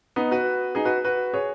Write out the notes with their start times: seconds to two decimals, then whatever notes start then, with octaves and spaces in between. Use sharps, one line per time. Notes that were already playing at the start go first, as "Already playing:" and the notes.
0.16 B3 D#4
0.31 F#4 B4
0.75 D#4 G#4
0.85 F#4 B4
1.05 F#4 B4
1.34 G#4 C#5